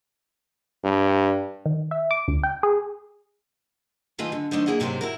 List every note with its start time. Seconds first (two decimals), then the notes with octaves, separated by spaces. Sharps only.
0.84 G2
1.66 D#3
1.91 E5
2.11 D6
2.28 D2
2.43 G5
2.63 G#4
4.18 D#3 A3 F4 B4 D#5 G#5
4.32 D3
4.51 D#3 A3 D4 D#4 C5
4.66 A#3 E4 G#4 D#5 F#5
4.80 G#2 C3 F#3 A#3 C5
5.01 E4 F#4 A#4